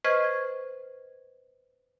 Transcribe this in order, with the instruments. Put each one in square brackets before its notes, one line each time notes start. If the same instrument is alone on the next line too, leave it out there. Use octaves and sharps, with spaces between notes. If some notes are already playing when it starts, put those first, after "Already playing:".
[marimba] B4 C5 D#5 C#6 F6 G#6